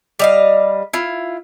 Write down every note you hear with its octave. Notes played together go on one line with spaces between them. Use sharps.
G3 D#5 F5
E4 F4